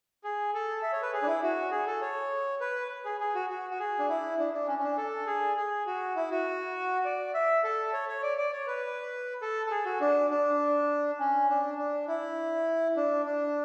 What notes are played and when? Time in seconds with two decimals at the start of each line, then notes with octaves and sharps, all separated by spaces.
0.24 G#4
0.54 A4
0.82 E5
0.92 C#5
1.02 B4
1.13 G#4
1.22 D4
1.27 E4
1.43 F#4
1.71 G#4
1.87 A4
2.02 C#5
2.61 B4
3.05 G#4
3.20 G#4
3.35 F#4
3.50 F#4
3.70 F#4
3.79 G#4
3.99 D4
4.08 E4
4.39 D4
4.53 D4
4.67 C#4
4.79 C#4
4.83 D4
4.97 A4
5.26 G#4
5.57 G#4
5.86 F#4
6.16 E4
6.31 F#4
7.05 D5
7.34 E5
7.64 A4
7.93 C#5
8.09 C#5
8.23 D5
8.38 D5
8.53 C#5
8.67 B4
9.42 A4
9.66 A4
9.71 G#4
9.85 F#4
10.01 D4
10.31 D4
11.20 C#4
11.49 D4
11.78 D4
12.08 E4
12.96 D4
13.26 D4